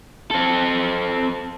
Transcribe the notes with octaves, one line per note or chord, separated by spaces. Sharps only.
C4 A4